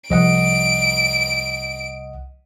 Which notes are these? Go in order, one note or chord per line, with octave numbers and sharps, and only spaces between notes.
C2 F3 D#5 F#5 D7